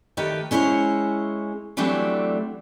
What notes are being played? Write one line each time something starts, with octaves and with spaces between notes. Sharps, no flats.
D#3 A3 G4 B4
G#3 C#4 E4 C5 C#5
E3 F#3 G3 A3 C4 D4